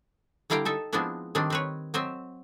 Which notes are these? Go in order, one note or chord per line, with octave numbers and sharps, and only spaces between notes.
D3 G3 E4 F5 G5 A#5
D#4 A4 E5
F3 G#3 B3 C4 D4 E4
D#3 G3 C4 D4 D5
C4 B4 C#5
F#3 C4 D#5 E5